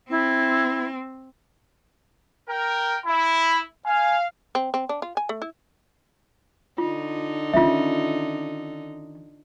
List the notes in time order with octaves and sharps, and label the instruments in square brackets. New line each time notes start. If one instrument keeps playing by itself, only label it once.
[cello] C4 [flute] E4
[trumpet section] A#4 G5
[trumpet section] E4 [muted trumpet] B5
[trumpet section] F5 [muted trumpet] G#5
[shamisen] C4
C4
D4
F4
G#5
A3
E4
[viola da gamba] D3 D#4 [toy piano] F4
[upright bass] D#3 C#4 [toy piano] F4 E5